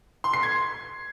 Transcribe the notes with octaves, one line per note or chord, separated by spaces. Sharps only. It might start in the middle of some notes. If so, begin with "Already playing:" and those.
C6
C7
G#6